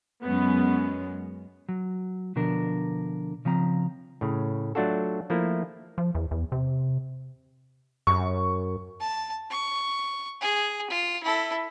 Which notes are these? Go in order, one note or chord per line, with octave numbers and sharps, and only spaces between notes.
F#2 G#3 B3 C#4
F#3
B2 D3 F3 D4 A#4
C#3 F3 C4 A#5
A2 C#3
F#3 A3 D4 F4 F#4 A4
F3 A3 A#3 E4
F3
E2
E2
C3
F#2 C#6
A5
C#6
G#4
F4
E4 A4